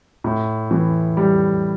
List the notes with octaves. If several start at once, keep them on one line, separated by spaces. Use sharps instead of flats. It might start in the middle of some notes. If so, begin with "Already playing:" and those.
A2
E3
G3